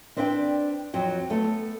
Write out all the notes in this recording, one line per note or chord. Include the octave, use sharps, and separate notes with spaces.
C4 D4 B4 D5 D#5 G5
F2 F#3 G5
A3 B3 A4